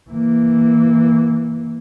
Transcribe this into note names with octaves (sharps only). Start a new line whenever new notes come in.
E3 A#3